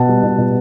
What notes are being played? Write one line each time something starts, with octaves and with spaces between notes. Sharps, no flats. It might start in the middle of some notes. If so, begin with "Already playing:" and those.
Already playing: B2 B3 F#5 A5
G3
B2
B2